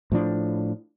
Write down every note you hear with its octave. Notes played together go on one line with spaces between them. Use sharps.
A2 F3 D4